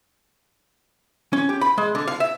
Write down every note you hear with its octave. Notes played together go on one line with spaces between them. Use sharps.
C#4
G4
B5
G#3
D3
F5
E5